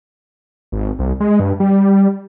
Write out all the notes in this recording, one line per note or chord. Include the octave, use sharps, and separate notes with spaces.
G#1
C2
G#3
G2
G3